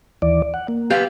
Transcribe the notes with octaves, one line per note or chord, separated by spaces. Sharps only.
D#2 E3 D5
F#5
A#3
B3 G4 F5